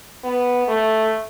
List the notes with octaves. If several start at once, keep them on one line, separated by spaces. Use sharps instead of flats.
B3
A3